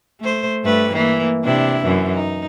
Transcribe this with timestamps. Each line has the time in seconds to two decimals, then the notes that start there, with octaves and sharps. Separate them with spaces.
0.21 A3 C5
0.63 G2 A3 B4
0.93 E3 A#3
1.43 C3 D4 E4
1.84 F#2 E3
2.14 D#4